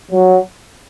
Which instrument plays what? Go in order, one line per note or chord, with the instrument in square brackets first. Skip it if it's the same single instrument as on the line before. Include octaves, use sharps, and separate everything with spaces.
[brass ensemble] F#3